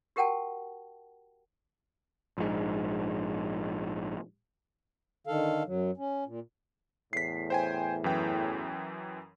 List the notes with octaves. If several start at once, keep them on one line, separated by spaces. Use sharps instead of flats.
F#4 G4 A#4 F#5 G5 A5
A#1 G#2
D3 D#3 A4 F5
F#2 F#3
C#4
A#2
E2 A2 B6 C7
C5 G5 G#5
F#2 E3 G5